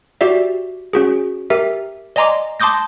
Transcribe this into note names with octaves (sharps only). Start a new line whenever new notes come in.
F#4 G4 D5 E5
C#4 F#4 G#4
G4 A#4 E5
D5 D#5 G#5 A#5 C6 D6
A5 C6 D6 D#6 G6 A#6